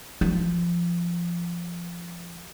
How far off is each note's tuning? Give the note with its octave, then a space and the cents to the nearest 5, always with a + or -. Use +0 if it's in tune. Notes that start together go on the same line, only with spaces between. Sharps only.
F3 -15